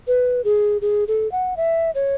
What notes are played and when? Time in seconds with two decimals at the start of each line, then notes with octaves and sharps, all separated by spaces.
0.07 B4
0.45 G#4
0.82 G#4
1.08 A4
1.32 F#5
1.57 E5
1.95 C#5